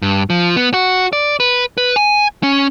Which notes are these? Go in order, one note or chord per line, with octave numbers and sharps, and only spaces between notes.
G2
F3
B3
F#4
D5
B4
B4
G#5
C#4